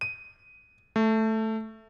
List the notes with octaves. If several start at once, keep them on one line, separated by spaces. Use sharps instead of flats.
D#7
A3